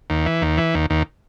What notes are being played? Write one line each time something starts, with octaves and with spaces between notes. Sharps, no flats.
D#2
E3
D#2
E3
D#2
D#2